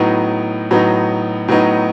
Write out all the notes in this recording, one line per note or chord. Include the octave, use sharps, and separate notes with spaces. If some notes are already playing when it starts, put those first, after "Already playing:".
Already playing: A2 F#3 B3 D#4
A2 F#3 B3 D#4
A2 F#3 B3 D#4